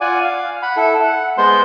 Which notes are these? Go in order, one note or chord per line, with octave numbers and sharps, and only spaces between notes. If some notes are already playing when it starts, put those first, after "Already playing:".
F4 D5 F#5 G#5 D6
F5
F#5 B5
E4 A4
F#5
G#3 B3 C5 C6